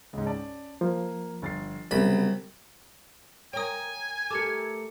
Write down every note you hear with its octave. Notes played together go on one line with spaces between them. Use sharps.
C#2 G#2
C#4 D5 A5
F3 A#3
G1 A6 C7
C2 C#3 F#3 B3 B5
A#4 C#5 G5 G#5 D#6
A3 G4 A#4 D6 C#7